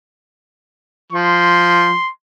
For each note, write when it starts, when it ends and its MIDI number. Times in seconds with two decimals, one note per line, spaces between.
1.13 1.92 53
1.13 2.11 84